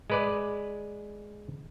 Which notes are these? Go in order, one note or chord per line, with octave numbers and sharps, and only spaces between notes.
G#3 B4 D5